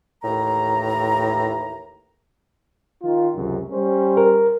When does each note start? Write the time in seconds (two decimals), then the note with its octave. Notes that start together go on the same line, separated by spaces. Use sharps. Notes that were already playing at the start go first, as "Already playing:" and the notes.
0.23 D#2 A2 E3 A#5
3.02 D#3 F4
3.34 C#2 F#2 C3
3.70 G3 C#4 C5
4.17 A#4